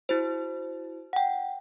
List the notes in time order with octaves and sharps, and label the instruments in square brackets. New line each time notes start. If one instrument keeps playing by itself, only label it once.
[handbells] E4 F#4 C5
F#5 G5